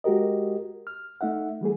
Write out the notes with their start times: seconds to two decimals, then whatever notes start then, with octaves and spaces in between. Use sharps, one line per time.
0.04 G#3 F#4 G4 A#4 D#5
0.87 F6
1.21 A3 D#4 E5 F#5
1.61 E3 G3 A3 G#4